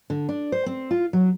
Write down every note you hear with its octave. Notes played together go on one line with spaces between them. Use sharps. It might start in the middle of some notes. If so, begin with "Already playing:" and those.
D3
D4
C5
C4
F4
F#3